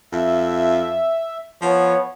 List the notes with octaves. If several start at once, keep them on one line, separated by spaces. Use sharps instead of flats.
F2 E5
F3 B3 C#5